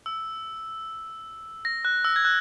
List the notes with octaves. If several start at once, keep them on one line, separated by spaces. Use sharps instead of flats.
E6
A#6
F#6
E6
G#6
F#6